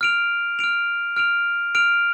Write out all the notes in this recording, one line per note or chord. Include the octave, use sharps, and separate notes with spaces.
F6 D7 F7
F6 D7 F7
F6 D7 F7
F6 D7 F7